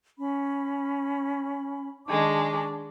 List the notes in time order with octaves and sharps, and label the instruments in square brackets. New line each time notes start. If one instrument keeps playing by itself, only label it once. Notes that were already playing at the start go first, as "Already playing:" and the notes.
[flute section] C#4 B5
[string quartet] D#3 G#3 D4 [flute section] A5 C#6 D6